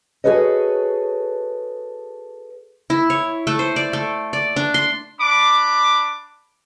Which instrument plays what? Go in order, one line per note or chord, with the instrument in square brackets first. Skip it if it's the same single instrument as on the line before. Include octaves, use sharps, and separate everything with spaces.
[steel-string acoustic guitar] F#4 G#4 A4 B4 C#5 D#5
[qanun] E4
C#5
A3
C5
D5
A3
D5
D4
C6
[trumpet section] D4 B5 D6